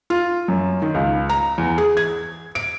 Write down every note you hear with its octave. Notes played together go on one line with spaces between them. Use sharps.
F4
F#2
D#3
C#2
A#5
E2
G#4
G#6
D7